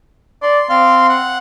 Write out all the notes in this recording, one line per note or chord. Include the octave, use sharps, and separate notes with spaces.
D5 C6
C4 F5 C6
F#5